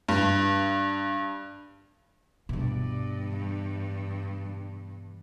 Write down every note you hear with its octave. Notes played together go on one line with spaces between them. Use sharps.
G2
G2 B2 E3